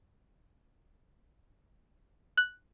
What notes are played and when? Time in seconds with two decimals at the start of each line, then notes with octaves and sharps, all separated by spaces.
2.37 F#6